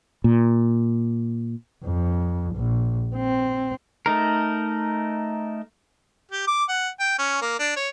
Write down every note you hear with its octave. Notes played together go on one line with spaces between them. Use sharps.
A#2
F2
A#1
C4
A3 D#4 A#4
G4
D6
F#5
G5
C#4
A#3
D4
C#5